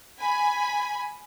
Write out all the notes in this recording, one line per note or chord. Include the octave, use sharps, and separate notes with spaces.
G#5 B5